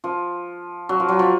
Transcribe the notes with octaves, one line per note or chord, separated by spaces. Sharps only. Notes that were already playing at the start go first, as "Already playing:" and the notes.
F3
F#3
F3
F#3
F3